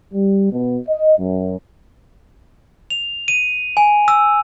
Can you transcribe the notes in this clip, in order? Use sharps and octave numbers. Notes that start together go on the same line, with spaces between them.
G3
B2
D#5
F#2
F7
D#7
G#5
E6